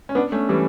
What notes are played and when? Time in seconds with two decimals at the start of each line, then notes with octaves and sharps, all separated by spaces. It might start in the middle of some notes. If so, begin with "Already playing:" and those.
0.09 C#4
0.15 B3 D4
0.32 A3 C#4
0.49 E3 G3